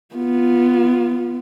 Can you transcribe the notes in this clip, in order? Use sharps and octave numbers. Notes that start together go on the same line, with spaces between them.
B3 F4